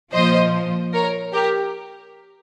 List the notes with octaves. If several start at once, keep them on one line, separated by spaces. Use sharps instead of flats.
A#2 F3 C5 D#5
A#4 C#5
G4 A#4